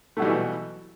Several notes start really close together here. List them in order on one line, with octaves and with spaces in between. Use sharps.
A3 F#3 G3 B2 E3